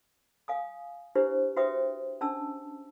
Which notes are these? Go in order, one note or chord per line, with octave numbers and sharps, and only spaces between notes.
F5 G#5 D#6
D4 E4 G4 B4 C5
F#4 B4 C5 E5 G5 D#6
C#4 D4 A5 E6